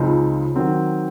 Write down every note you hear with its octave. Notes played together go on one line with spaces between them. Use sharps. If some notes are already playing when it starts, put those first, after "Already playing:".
Already playing: C#2 C#3 F3 C4 D#4
D#3 F#3 C4